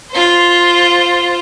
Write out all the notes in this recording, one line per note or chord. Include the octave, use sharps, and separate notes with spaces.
F4 C5